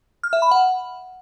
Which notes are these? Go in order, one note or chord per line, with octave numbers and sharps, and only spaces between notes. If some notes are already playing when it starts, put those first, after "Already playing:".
F6
E5
B5
F#5